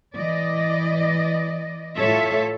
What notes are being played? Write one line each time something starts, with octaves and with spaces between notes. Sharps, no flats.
E3 D5 D#5
A2 F4 A4 C#5 E5